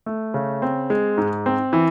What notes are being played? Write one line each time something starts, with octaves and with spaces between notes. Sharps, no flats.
A3
C#3
C4
G#3
G#2
C4
E3